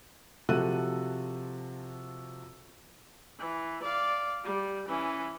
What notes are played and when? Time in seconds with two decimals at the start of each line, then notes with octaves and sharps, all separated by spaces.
0.49 C3 F3 F#4 A4 F#6 D#7
3.39 E3
3.83 D5 F5
4.44 G3
4.89 E3 C#4